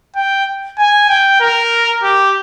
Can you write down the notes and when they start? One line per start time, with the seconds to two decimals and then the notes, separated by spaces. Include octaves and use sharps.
0.16 G5
0.78 G#5
1.09 G5
1.41 A#4
2.03 G4